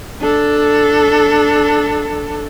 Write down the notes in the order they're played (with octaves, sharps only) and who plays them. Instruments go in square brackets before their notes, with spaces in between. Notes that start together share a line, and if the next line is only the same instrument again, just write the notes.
[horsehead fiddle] D4 A4